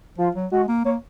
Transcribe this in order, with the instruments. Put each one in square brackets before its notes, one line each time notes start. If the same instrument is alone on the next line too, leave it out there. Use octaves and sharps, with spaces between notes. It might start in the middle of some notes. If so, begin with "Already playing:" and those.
[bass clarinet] F3 [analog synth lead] F4
[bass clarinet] F#3
[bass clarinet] G#3 [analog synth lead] F#4
[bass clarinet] A#3
[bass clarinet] A#3 [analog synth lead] C#5